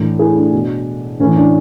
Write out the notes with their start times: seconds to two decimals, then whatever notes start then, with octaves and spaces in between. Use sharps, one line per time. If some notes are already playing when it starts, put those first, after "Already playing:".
Already playing: A2 E3 D4
0.19 E4 G#4
0.36 D4
0.53 B2
1.20 A2 E3 C#4
1.36 D4